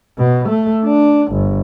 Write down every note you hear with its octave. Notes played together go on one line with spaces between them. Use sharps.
B2
A3
D4
G1